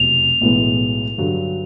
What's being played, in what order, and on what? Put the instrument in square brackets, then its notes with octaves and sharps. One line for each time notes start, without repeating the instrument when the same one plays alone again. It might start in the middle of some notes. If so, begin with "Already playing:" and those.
Already playing: [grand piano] F1 E2 B2 F#3 [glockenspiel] F7
[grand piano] B1 A2 E3 G#3 B3
G2 D3 F#3